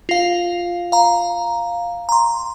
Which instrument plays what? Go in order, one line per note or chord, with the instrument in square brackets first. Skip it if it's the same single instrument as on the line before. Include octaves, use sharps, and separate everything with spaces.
[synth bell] F4 F5
F5 A#5
A#5 C6